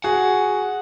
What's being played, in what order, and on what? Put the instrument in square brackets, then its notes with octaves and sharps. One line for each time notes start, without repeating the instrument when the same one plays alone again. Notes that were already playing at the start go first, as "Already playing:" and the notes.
[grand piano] F#4 G#4 [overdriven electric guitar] F#5